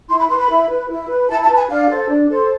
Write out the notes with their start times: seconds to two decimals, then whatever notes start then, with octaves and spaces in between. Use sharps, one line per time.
0.09 E4 C6
0.19 B5
0.30 B4 C6
0.39 B5
0.49 E4
0.69 B4
0.89 E4
1.09 B4
1.29 E4 A5
1.43 A5
1.48 B4
1.56 G#5
1.69 D4 F5
1.89 A4 C5
2.09 D4
2.29 A4 C5